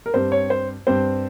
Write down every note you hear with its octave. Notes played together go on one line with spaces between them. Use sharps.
A#4
G2 G3 C4 C5
C#5
C5
G2 G3 C4 C5